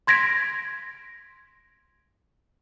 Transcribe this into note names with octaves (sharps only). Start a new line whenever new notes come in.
C6 G#6 A#6 B6 D7